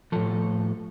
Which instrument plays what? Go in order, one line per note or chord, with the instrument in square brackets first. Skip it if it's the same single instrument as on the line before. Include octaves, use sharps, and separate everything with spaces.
[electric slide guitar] A2 F3 A4